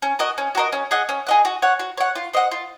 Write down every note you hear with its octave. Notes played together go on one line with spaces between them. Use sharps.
C#4
F#4 A#4 D#5
C#4
F#4 A#4 D#5
C#4
G#4 D#5 F#5
C#4
G#4 D#5 F#5
F#4
C#5 F#5
F#4
C#5 F#5
F4
C5 D#5 F#5
F4